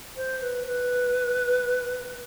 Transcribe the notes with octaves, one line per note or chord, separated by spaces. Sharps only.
C5
B4
B4